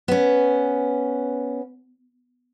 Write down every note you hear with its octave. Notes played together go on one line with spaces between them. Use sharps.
B3 C#4